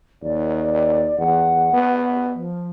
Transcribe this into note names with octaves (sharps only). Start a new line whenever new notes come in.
D#2 D5
D5
E2 F#5
B3
F3